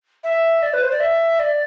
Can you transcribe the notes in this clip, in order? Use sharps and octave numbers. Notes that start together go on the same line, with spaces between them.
E5
D5
B4
C5
D5
E5
D5